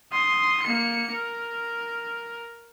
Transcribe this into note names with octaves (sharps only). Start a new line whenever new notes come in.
C6 D#6
A#3 C#7
A#4